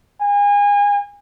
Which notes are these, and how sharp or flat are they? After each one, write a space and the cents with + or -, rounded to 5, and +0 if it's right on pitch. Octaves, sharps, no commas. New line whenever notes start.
G#5 -30